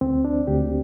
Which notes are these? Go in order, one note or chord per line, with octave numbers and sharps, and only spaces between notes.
D2 C4
D4
D2 G4